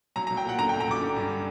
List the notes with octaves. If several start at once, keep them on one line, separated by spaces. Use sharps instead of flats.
F#3 A#5
A#5
F#3
G5
A#2 F#5
D3 A#5
G5
F#2
A#5
F#2 D6
D3
G2